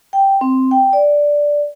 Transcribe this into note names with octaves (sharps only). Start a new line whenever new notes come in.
G5
C4
G5
D5